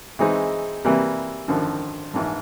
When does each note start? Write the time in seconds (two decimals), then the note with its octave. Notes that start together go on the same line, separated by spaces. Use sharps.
0.19 E3 G#3 C4 D#4
0.85 C3 E3 G3 A#3
1.48 G#1 F#2 D3 F3
2.13 A#1 G#2 E3